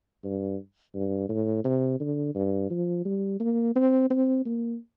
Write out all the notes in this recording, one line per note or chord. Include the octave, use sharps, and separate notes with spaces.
G2
G2
A2
C3
D3
G2
F3
G3
A#3
C4
C4
A#3